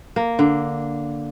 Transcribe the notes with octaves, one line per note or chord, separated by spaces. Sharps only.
A#3
D3